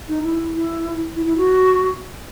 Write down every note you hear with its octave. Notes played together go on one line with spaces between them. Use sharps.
D#4
E4
E4
E4
E4
F#4